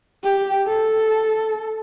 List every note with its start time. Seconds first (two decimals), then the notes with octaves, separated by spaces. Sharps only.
0.24 G4
0.67 A4